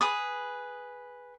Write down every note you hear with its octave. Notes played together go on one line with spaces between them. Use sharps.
G#4 B4 D#6